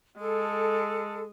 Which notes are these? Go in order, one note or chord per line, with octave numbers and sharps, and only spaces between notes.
G#3 A4